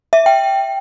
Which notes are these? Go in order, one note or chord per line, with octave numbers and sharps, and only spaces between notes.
E5
G5